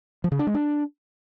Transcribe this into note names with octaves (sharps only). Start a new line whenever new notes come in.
F3
C#3
D4
G#3
D4